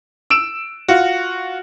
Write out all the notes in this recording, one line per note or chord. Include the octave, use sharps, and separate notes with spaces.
E6 D7 E7
F4 F#4